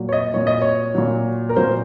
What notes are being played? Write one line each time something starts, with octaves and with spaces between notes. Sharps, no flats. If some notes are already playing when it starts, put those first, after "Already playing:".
Already playing: A#2 F#3
C#5
D#5
A#2 F#3 C#5
D#5
C#5
A#2 F#3
A#4
A#2 F#3 C5